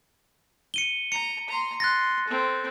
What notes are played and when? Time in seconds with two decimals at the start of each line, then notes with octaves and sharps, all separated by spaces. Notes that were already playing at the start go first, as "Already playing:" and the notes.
0.74 C#7 D#7 G7
1.12 A#5 C#7
1.48 A#5 C6
1.80 C6 F#6 A6 A#6
2.27 C4 A4